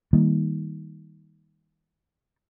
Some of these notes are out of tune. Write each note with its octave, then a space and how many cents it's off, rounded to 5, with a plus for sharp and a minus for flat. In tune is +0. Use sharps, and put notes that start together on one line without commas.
D#3 +20 G3 +15 A#3 +0